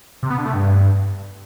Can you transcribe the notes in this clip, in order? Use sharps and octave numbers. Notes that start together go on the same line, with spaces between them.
C3
B3
D3
A3
G2